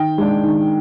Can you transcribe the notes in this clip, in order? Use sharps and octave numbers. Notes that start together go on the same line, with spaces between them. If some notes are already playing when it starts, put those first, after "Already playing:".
Already playing: D#3 G5
G#3 D4
D#3